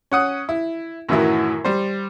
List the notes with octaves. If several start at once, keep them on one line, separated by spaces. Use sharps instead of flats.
C#4 F#5 D#6 F#6
E4
F#2 A2 D#3 E3 F#3 E4
G3 C5